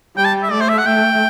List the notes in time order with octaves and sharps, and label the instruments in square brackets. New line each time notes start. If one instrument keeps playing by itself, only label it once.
[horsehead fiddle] G3 [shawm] G5
[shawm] A5
E5
[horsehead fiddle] A3 [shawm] D5
[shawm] C5
E5
F#5
[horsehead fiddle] A3 [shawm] G5